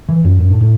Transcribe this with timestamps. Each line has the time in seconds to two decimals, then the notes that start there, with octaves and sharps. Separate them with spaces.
0.09 E3
0.25 F#2
0.40 F#2
0.50 A2
0.61 A2